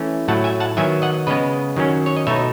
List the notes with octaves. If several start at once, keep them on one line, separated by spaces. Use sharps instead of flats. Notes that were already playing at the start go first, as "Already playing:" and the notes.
Already playing: E3 A3 C#4
A2 F#3 A3 F#5 A5
E5 G#5
F#5 A5
D#3 F#3 B3 E5 G#5
D#5 F#5
C#3 G#3 B3 B4 D#5
D#3 F#3 C#4
C#5
D#5
B2 A3 D#4 C#5 E5